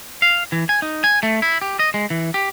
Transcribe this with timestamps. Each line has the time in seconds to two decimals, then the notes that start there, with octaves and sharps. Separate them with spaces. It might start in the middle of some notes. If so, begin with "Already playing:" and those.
0.22 F5
0.52 E3
0.69 G#5
0.82 D#4
1.04 G#5
1.23 A3
1.42 E4
1.62 G4
1.79 D#5
1.94 G#3
2.10 E3
2.34 G4